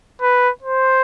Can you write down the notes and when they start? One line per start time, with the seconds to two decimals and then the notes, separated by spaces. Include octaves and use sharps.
0.21 B4
0.62 C5